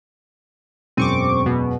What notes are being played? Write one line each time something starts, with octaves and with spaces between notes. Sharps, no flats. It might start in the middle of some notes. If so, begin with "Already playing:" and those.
E1 F#2 C4 C#6 D6 D#7
B2